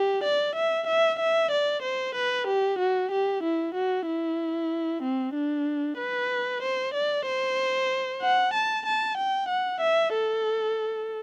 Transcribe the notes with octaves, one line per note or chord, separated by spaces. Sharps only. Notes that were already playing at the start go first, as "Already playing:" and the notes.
Already playing: G4
D5
E5
E5
E5
D5
C5
B4
G4
F#4
G4
E4
F#4
E4
C4
D4
B4
C5
D5
C5
F#5
A5
A5
G5
F#5
E5
A4